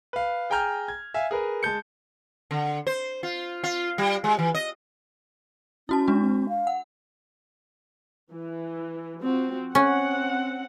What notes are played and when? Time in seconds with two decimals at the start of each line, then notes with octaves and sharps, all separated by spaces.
0.13 B4 F5
0.50 G#4 G5 G#5 A#5 F6 G6
0.88 G#6
1.14 E5 F5 G#5
1.31 G#4 A#4 B4
1.63 G#3 A5 G6 C#7
2.51 D3
2.87 C5
3.23 F4
3.64 F4
3.98 G3
4.24 G#3
4.39 E3
4.55 D#5
5.89 C#4 E4 F#4 A5
6.08 G#3 D4 F#4
6.21 C4
6.49 F5
6.67 F#5
8.31 E3
9.22 F3 C4 F#4
9.75 C4 C#4 F#5